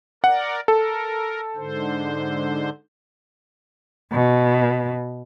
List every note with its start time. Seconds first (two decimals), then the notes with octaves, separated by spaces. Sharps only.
0.24 A#4 D5 F#5
0.68 A4 A#4
1.56 G#2 D3 C5
4.12 B2